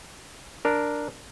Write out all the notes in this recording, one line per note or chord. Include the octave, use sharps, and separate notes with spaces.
D4 A#4